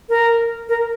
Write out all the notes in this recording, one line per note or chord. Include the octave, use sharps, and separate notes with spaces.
A#4
A#4